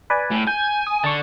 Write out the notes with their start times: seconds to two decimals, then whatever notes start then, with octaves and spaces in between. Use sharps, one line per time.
0.10 B4 D5 G#5
0.31 A2
0.47 G#5 G6
0.87 D#6
1.04 D3 A5 C#6